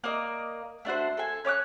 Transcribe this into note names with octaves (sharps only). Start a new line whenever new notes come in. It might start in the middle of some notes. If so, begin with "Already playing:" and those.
A#3 A#4 D5 D#5
A3 D4 F#4 C5
A4 G#5
C#4 C#5 D6 F#6